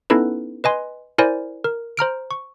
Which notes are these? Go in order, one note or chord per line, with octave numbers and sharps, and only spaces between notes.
B3 C#4 D#4 E4 A4 B4
B4 D#5 G#5 C6
E4 A#4 C5 D5 G#5
A#4
C5 A#5 F6 D7
C#6